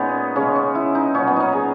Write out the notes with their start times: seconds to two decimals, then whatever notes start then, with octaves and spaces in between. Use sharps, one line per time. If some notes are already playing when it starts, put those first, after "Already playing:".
Already playing: A#2 G#3 B3 C#4 D#4
0.36 C#3 G#3 C#4
0.55 C#4
0.75 E4
0.95 D#4
1.14 A#2 F#3 C#4
1.27 B3
1.36 C#4 D#4
1.53 G#4